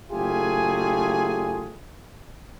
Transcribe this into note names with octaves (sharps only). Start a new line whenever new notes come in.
F#1 A3 F4 G4 G#4 G#5